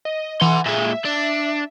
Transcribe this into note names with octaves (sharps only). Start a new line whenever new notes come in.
D#5
E3 F#5 C6
A#2 G#3 E5
D4